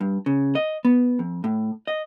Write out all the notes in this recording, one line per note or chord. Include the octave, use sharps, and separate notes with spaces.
G2
C#3
D#5
B3
F2
A2
D#5